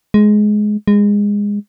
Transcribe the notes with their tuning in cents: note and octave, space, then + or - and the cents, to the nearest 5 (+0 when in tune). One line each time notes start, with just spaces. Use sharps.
G#3 +15
G#3 -20